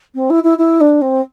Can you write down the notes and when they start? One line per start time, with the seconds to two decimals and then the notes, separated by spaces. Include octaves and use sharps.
0.15 C4
0.30 E4
0.43 E4
0.58 E4
0.80 D4
1.01 C4